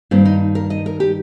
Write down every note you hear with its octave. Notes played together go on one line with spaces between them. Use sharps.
G2 D#3 A#3 C4
D#4
A#4
D#5
A#4
G4